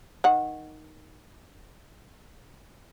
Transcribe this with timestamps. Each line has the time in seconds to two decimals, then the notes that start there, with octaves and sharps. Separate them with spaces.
0.24 D#3 F#5